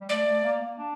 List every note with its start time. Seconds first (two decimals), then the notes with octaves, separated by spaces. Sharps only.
0.01 G3
0.09 A3 D5
0.26 A3
0.44 A#3
0.61 A#3
0.78 D4